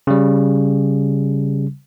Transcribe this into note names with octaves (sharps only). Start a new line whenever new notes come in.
C#3 G3